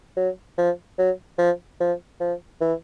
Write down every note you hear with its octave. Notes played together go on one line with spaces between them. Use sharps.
F#3
F3
F#3
F3
F3
F3
E3